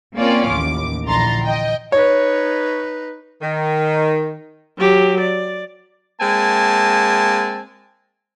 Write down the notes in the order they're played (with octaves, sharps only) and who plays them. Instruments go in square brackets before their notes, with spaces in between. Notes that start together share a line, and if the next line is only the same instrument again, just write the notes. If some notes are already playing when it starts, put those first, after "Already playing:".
[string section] A#3 C4 C#4 F4 D5
A1 D#2 D6
A#1 D3 E3 A#5 C6 A6
D#5 G5
[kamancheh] D#4 B4 [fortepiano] C#5
[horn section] D#3
[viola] F#3 G4
D5
[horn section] G#3 A#3 C4 G#5 A5